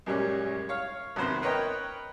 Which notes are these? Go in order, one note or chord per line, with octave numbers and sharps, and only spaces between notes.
F#2 A#2 G3 G#3 C#4
C#5 F5
G#1 F#2 C3 B3 C5 B5
A#4 B4 C#5 D#5 G5